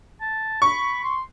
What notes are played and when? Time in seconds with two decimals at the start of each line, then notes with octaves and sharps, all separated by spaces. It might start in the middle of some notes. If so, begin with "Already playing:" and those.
0.21 A5
0.62 B5 C#6
1.04 C6